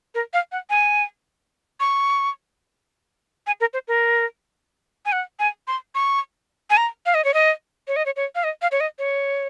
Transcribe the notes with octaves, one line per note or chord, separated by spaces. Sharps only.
A#4
F5
F#5
G#5
C#6
G#5
A#4
C5
A#4
G#5
F#5
G#5
C6
C#6
G#5
A#5
F5
D#5
C#5
D#5
C#5
D#5
C#5
C#5
F5
D#5
F5
C#5
D#5
C#5